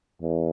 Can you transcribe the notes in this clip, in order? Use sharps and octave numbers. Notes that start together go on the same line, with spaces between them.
E2